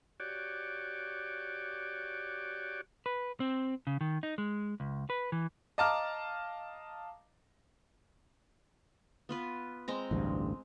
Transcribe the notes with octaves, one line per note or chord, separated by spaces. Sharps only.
F#4 G4 C#5 D5
B4
C4
C#3
D#3
D#4
G#3
C#2
B4
E3
D#5 F5 A5 A#5 D6 F6
B3 F4 B4
G#3 C4 A#5
A1 D2 G2